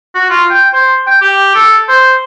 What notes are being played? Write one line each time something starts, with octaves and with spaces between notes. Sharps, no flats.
F#4
F4
G5
C5
G5
G4
A4
C5